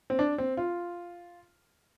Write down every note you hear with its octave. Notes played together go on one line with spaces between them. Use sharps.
C4
D4
C4
F4